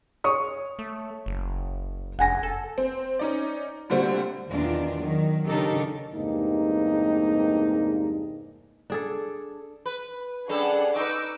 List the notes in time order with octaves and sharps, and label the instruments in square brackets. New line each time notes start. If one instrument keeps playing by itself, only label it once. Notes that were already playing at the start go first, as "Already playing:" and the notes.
[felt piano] C#5 C#6 D#6
[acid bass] A3
F#1
[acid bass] F1 [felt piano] F#5 G#5 A#6
[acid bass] A4
[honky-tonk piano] C4
C#4 D#4 D5
A#2 D3 G3 A3 C4 F#4
[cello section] E2 B2 D#3 D4 F4
D#3 F#3
C#3 D4 D#4 G4 A4 A#4
[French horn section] E2 G2 C3 G#3 A#3 D#4
[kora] D4 G#4 A4
[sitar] B4
[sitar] G3 C#4 A4 [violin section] D4 G#4 F#5
[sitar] D#4 B4 [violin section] C#6 D6 E6